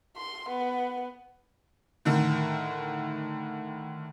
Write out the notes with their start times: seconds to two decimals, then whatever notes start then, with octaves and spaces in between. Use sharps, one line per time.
0.17 C6
0.49 B3
2.05 A2 D3 D#3